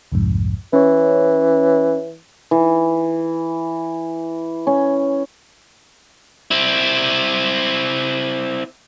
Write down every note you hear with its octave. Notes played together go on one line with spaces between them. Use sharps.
C2 F2 G#2
E3 C#4 C#5
E3
C#4
C4 E4